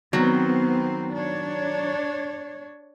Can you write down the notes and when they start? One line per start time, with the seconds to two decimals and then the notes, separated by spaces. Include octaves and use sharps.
0.13 D#3 F#3 B3 C4
1.13 D4 C#5